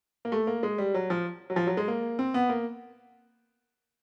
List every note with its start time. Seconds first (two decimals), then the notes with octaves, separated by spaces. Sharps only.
0.25 A#3
0.32 A3
0.47 A#3
0.63 G#3
0.78 G3
0.94 F#3
1.10 F3
1.50 F#3
1.56 F3
1.67 F#3
1.77 G#3
1.88 A#3
2.19 C4
2.34 B3
2.49 A#3